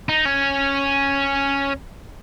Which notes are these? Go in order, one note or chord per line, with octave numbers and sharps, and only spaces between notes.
D#4
C#4